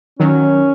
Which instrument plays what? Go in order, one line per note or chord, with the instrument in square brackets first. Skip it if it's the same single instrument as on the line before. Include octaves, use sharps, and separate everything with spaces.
[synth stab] D#3 F#3 [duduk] C#4